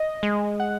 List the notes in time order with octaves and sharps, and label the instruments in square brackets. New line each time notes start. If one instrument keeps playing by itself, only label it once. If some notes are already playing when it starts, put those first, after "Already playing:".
Already playing: [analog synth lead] D#5
[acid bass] G#3
[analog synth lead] F#5